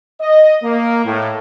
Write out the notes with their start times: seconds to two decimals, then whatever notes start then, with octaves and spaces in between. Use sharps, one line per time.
0.21 D#5
0.63 A#3
1.05 A2